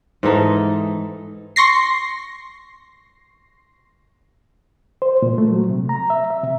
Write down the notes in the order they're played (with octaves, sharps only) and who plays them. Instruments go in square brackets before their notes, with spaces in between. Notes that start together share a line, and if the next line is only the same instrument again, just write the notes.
[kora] G#2 E3 D#4 A4
[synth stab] C6 C#6 A#6 C7
[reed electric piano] C5
A#2
A3
F#3
C3
A#5
E5
E5
C3